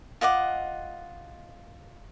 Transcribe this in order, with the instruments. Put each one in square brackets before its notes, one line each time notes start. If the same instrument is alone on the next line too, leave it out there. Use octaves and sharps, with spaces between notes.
[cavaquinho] F4 D#5 F#5 D6